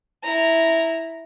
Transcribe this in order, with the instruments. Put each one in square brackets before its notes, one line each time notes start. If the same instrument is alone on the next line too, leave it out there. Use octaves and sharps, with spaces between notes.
[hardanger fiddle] E4 A#5